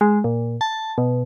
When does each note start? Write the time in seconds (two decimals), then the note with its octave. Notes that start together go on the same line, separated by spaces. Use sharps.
0.01 G#3
0.24 A#2
0.61 A5
0.98 B2